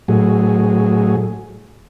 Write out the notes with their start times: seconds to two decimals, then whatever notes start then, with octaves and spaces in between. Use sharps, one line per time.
0.08 A2 F#3 G#4